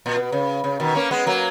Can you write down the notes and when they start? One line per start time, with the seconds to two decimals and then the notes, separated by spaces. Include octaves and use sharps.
0.06 A#2
0.17 B2
0.32 C#3
0.64 C#3
0.80 B2 D#3
0.95 A#3 C#4
1.11 G#3 B3
1.26 F#3 A#3